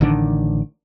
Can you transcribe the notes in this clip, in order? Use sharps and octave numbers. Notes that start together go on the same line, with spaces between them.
A1 D3 D#3 D4